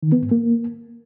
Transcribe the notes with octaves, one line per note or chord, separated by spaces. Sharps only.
D#3
B3
G#2
A#3